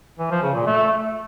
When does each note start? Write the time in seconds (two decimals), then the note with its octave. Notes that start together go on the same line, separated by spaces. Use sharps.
0.19 E3
0.31 F3
0.43 C#3
0.55 A#2
0.67 A3